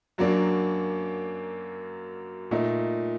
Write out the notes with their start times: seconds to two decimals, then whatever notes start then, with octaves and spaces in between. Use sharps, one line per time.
0.18 F#2 F#3 A#3 D4
2.51 A#2 A3 D#4